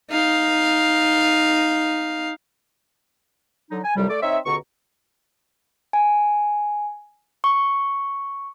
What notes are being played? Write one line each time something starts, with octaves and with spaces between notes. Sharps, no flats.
D#4 F5
D3 F#3 D#4
G#5
C2 F2 C3 F#3 G3
A3 A4 D5
C4 D#4 C#5 E5
C#2 B2 D3 A#5 C#6
G#5
C#6